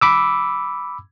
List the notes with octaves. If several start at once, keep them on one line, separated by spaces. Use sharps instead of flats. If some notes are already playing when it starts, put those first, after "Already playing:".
B5 D6 E6